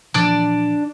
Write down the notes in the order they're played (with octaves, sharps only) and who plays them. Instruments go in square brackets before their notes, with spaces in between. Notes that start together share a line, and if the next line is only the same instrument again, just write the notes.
[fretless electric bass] A#2 E3 F3 [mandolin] D4 D5